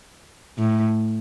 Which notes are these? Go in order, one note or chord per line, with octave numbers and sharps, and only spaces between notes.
A2